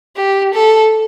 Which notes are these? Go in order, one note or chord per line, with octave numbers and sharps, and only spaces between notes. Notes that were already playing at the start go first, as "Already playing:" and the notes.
G4
A4